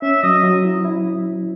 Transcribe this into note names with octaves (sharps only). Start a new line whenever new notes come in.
C#4 E5
F#3 D#5
F#3
E4
E4